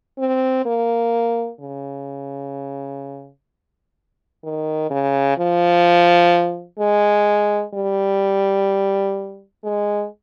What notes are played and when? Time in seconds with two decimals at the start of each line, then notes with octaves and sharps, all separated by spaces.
0.18 C4
0.65 A#3
1.60 C#3
4.44 D#3
4.90 C#3
5.38 F3
6.79 G#3
7.74 G3
9.64 G#3